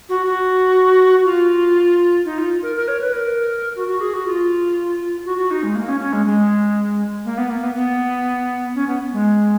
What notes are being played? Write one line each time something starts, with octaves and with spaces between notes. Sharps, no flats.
F#4
F#4
F4
D#4
F4
A#4
A#4
C#5
B4
A#4
F#4
F#4
G#4
F#4
F4
F#4
F#4
D#4
G#3
A#3
C#4
C#4
G#3
G#3
A#3
B3
A#3
B3
B3
C#4
B3
G#3